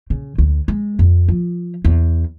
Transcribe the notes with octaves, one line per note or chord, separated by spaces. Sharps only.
C#3
D2
G#3
F2
F3
E2